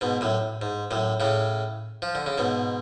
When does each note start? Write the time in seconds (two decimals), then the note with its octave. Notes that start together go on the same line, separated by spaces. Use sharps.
0.01 G#2 B2
0.21 F#2 A2
0.62 G#2
0.91 F#2 A2
1.20 A2 C#3
2.02 F3
2.15 D3
2.26 C#3
2.38 G#2 B2